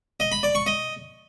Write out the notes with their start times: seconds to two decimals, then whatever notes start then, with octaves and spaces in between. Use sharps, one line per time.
0.20 D#5
0.32 B5
0.43 D5
0.55 C#6
0.66 D#5